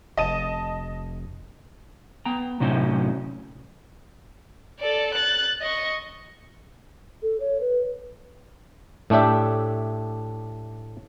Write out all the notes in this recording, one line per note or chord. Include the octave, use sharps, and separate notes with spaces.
F1 D#5 A5 D#7
B3 G5 A#5
A2 C3 F#3 C#4 D#4 C5
A4 D5
F#6 A6
D#5 C#6
A4
C#5
B4
A2 A3 D4 G4 E5